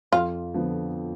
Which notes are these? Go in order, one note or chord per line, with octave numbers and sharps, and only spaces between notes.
F2 F4
D3 F3 B3